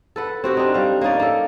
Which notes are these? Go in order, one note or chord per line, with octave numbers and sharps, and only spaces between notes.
A4 B4 F#5
C4 F#4 G4
D4 D#4
G3 F5
A#3 C#4 D#4 D5
A#3 A4